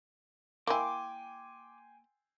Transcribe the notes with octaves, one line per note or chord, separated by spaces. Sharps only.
A#3 E4 G5 G#5 C6 D6